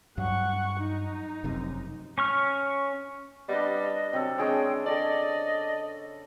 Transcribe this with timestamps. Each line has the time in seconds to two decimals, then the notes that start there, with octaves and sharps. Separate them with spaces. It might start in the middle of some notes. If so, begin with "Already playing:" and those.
0.18 G2 F#3 F#5 C#6
0.79 D#4
1.44 F1 F#2 C3
2.18 C#4 C#6 F6
3.48 G3 B3 D4 D#5
4.13 C3 F#3 A4
4.38 C#3 G#3 D4 G#4 C#5 G5
4.86 D4 A4 D5 D#5